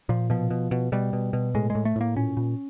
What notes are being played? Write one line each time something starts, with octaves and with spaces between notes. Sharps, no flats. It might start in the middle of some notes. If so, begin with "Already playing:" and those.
A#2 F3
B2 F3
B2
B2
B2 G3
B2
B2
A2 G#3
G#3
A2
A3
A2 A#3
A#2 C#4
A#2